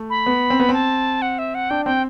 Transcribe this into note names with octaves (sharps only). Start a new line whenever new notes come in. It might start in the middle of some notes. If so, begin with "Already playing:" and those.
Already playing: A3
B5
B3
C4
B3
C4 A5
F#5
E5
F#5
D4 G5
C4 G5